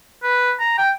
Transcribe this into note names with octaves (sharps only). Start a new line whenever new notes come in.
B4
A#5
G5